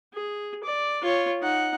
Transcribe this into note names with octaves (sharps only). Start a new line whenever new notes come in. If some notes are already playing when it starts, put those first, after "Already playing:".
G#4
D5
F4 C#5
D#4 F#5